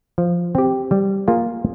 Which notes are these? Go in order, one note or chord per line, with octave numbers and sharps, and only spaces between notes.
F3
C4 G4
G3
A#3 F4 G#4